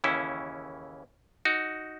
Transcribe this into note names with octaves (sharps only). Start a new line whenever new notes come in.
D#2 C#3 E3 C#4 E4
D#4 F#4